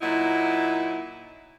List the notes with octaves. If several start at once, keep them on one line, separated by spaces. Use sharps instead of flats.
A#2 F#3 D#4 E4